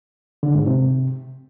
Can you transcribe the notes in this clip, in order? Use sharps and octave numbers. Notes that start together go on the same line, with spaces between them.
D3
G#2
C3